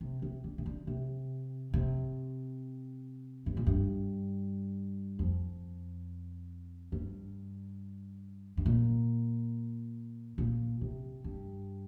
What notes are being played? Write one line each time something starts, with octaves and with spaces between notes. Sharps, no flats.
C3
C3
D3
C3
D3
C3
C3
G2
A#2
G2
F2
G2
G2
A#2
A#2
C3
G2